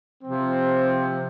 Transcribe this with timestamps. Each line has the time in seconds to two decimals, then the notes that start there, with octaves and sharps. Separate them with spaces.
0.21 C3 F3 C4